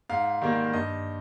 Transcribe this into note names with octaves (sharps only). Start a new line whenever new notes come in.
G#2 F5
D#3 G3 A#3
G2 D#5